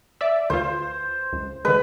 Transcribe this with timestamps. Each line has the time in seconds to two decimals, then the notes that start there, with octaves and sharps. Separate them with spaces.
0.21 D5 E5
0.50 D2 F4 C5
1.33 C#2
1.65 D3 G#3 B4